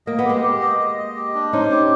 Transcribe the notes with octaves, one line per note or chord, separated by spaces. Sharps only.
A#3 D#5
B3
G#3 A#3 G4
G4
D#5
D#5
D#5
G4
D4
C#4 D#4 C5
G4